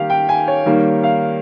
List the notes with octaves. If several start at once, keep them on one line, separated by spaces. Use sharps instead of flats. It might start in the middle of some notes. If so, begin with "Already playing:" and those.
Already playing: D#3 G3 A#3 G4 F5
G5
G#5
C#5
D#3 G3 A#3
F5